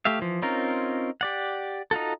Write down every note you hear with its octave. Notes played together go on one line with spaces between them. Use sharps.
A3 G4 E5 F5
E3 F3
C4 C#4 D#4 F4 A#4
G4 D5 F#5
D#4 F4 F#4 A4